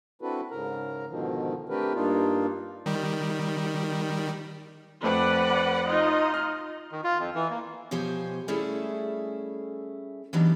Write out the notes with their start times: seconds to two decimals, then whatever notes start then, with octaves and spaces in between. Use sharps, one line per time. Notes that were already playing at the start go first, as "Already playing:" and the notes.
0.22 C4 D4 E4 F#4 A4 B4
0.51 G#2 C#3 A#4 A#5
1.09 G#2 B2 D3 D#3 F3
1.69 A3 C4 D4 G4 A#4 B4
1.94 G2 A#3 D4 D#4 F4
2.86 D#3 G3
5.03 F2 A3 C4 B4 D5 F#5
5.86 D#4 F4 D#5
6.34 F6
6.92 D#3
7.04 F4
7.19 F2
7.35 E3
7.50 A#3
7.91 B2 F3 G4 C5 C#5 G#5
8.48 G3 A3 C#4 E4 G#4 A4
10.33 E3 F#3 G3 B3 D4 D#4